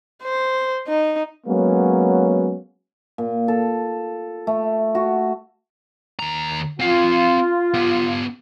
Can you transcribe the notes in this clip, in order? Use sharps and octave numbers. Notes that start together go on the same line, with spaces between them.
C5
D#4
F#3 G#3 A#3 B3 C#4
A#2
A4
A3
F#4
D#2 A#5
C4 F4 F5
B3 G4